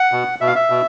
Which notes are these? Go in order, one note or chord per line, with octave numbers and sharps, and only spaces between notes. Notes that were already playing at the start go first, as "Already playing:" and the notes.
Already playing: F#5
B2
B2 E5
F5
E5
B2